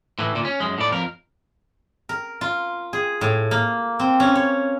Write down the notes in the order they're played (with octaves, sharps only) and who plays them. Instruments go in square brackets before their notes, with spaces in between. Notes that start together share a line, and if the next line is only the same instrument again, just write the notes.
[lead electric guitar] A2 E3
D2 A#2
C#4
F#2 G#3
A2 D5
F2 A#4
[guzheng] A#4
F4
G#4
A2
A#3
C4
C#4
C#5